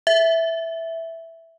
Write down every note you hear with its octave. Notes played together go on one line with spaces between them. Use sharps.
E5